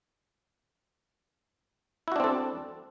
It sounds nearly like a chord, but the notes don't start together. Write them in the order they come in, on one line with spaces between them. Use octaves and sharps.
E4 F#4 D4 C4 A4